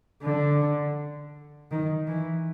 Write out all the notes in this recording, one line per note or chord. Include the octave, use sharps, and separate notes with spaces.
D3
D#3
E3